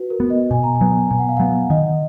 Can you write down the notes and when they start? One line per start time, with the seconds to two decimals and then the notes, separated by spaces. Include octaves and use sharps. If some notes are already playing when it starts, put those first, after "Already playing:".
Already playing: F#4 B4
0.10 A#4
0.20 B3
0.30 D#5
0.51 B2 G#5
0.63 A#5
0.75 G#5
0.81 F#3 B3
1.10 B2 G#5
1.19 F#5
1.29 F5
1.37 F#3 B3 F#5
1.70 D#3 D#5